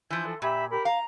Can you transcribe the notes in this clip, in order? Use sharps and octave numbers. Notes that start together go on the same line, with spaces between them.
E3 F3 G6 G#6
A4
A#2 G4 E5 B5
G4 A#4 B5
F5 A#5